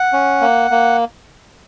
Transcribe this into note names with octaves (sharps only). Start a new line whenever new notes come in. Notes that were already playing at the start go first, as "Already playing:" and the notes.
Already playing: F#5
C#4
A#3
A#3